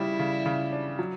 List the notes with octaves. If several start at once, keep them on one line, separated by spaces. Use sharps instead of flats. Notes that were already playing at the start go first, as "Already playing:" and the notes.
Already playing: C#3 G3 E4
C#3
C#3
D4
F#3